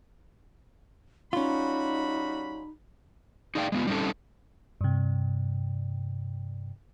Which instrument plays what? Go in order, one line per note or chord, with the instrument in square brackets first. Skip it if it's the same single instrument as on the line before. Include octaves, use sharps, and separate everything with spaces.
[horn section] G3 F#4 B5 [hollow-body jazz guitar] C#4 F4 [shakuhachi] D#4
[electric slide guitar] D#4 G#4 D5 F5 G5
G#3 B3 F4
G3 C4 C#4 D#4 A4
[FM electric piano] G2 C3